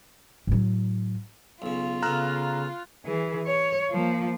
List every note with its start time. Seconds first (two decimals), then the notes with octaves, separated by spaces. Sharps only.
0.47 A2 F#3
1.62 B1 C#3 F4
2.03 C#3 B3 A4 A#5 F6 F#6
3.04 E3 G#4
3.46 C#5
3.91 F3 A#3